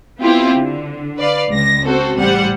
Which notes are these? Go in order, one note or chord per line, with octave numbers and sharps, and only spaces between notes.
B3 C4 E4 F4 G4
D3
B4 D5 F5
C#2 A#6
C4 F#4 A4 C5
A1 G3 G4 C5 F#5